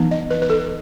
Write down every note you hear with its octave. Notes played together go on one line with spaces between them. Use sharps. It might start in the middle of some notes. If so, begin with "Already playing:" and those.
Already playing: E3 B3 D#4
D#5
B4
B4
A4